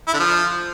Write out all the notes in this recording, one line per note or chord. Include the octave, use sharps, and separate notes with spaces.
E4
D3
F3